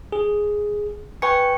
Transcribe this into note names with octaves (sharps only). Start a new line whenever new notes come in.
G#4
B4 G5 G#5 C#6 C#7